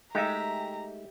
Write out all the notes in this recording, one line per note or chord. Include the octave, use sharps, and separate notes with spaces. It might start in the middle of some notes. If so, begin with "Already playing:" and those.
G#3 A3 D#4 G4 E5 A#5